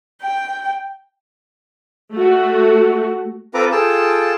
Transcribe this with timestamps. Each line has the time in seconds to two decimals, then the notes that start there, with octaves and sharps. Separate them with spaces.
0.21 G5
2.13 A3 F#4
3.54 C4 F4 A4 B4 A#5 D6
3.72 F4 G#4 A4 G5 A5